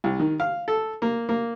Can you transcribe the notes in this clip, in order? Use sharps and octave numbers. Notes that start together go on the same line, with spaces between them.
C2
D#3
F5
A4
A#3
A#3